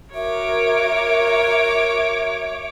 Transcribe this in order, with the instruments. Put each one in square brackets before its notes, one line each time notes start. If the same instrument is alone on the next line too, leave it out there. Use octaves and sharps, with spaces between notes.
[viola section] F#4 A#4 [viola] C#5 D6 [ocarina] E5